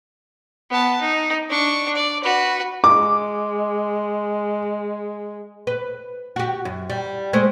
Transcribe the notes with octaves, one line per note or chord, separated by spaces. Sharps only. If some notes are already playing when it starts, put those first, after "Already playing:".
B3 A5
D#4
D4 C#6
D5
F#4 B4
G#3 D6
B4
F#4 G4
F#2
G3
G#3 A3 C5